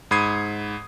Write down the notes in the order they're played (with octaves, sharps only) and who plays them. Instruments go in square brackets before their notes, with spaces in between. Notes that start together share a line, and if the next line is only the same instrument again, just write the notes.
[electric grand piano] G#2 B5 D#6 G#6 C7 D#7